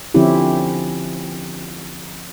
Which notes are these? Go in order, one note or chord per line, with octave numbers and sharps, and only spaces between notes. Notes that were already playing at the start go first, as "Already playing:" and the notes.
D3 F3 C4 C#4 E4 G4